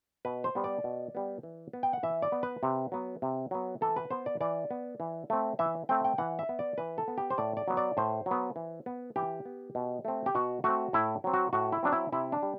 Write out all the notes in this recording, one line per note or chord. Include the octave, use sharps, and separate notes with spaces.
B2 B4
C5
G3 B3
D5
B2
G3 B3
E3
B3
G5
F#5
E3 E5
D5
B3
B4
C3
F#3 B3
C3
F#3 B3
E3 A4
B4
B3 C5
D5
E3 D5
B3
E3
A3 C4
E3 E5
A3 C4 G5
G5
E3 F#5
E5
B3
D5
E3 B4
A4
B3
G4
C5
A2 D5
D5
F#3 B3
D5
A2 C5
F#3
B3
E3
B3
E3 G4
B3
B2
A3 C4
G4
B2 F#4
A3 C4 F#4
A2 E4
F#3 C4
F#4
A2 F#4
E4
F#3 C4 D4
E4
C3 E4
D4
G3